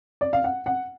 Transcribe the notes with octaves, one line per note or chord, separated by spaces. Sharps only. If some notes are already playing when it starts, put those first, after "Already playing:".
D5
F5
F#5
F#5